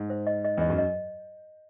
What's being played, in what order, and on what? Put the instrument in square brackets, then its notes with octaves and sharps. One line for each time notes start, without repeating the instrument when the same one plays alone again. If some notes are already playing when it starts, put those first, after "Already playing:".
Already playing: [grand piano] G#2
[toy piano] C5
D#5
D#5
[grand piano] E2 [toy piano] D#5
[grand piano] F#2
[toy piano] D#5